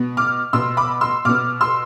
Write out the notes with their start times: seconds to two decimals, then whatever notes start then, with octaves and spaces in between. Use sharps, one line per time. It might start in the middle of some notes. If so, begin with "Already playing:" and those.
Already playing: B2 B3
0.17 D6 F6
0.53 B2 B3 C6 E6
0.77 B5 D6
1.01 C6 E6
1.25 B2 B3 D6 F6
1.61 C6 E6